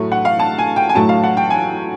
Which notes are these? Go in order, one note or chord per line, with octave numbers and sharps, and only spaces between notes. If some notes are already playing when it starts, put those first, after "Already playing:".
Already playing: A2 F#3 A3
F#5
F5
A5
G#5
G5
G#5
A2 F#3 A3 A5
F5
F#5
G5
G#5